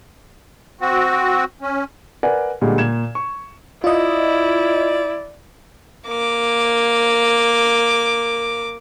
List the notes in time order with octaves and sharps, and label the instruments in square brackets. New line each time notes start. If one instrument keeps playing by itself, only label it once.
[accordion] C4 F#4
C#4
[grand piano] A#4 B4 D5 F#5 G#5
A#2 D3 G3 G#3
A#2 G#6 E7
C#6
[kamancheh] E4 [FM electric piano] F4 D#5 [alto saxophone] D5
[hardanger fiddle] A#3 D6